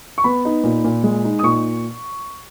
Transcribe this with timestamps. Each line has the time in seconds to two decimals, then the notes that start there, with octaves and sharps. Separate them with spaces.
0.18 C#6
0.24 B3 B5
0.45 D#4
0.64 A#2
0.84 A#2
1.03 G#3
1.24 D#4
1.39 D#6
1.43 A#2 C#6